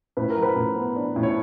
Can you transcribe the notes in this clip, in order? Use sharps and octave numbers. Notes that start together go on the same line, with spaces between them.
A2 B4
A#4
F#3
B4
A2
B3
D4
A2
C#5